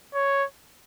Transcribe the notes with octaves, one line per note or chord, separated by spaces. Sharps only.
C#5